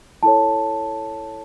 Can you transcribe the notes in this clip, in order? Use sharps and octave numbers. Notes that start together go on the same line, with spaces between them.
E4 A4 C#5 A5